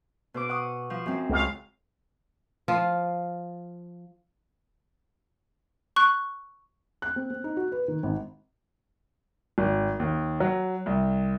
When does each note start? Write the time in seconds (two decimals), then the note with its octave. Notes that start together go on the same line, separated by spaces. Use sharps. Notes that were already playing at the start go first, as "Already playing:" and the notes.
0.34 B2 C5 D6
0.49 F#5 C#6 D#6
0.90 F3
1.06 F#2 C4
1.29 C#2 F5
2.68 F3 F4
5.96 C#6 F#6
7.02 F#6
7.16 C4
7.30 C4
7.44 D#4
7.57 F#4
7.72 B4
7.88 D#3
8.03 G#1
9.58 G#1
10.00 D#2
10.40 F#3
10.86 C2